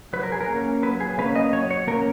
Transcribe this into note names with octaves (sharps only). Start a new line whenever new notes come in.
F#3 B4
A#4
G#4
A#4
A#3 C#4
F#3 B4
G#4
A#3 C#4 B4
D#5
F#3 C#5
C#5
A#3 C#4 A#4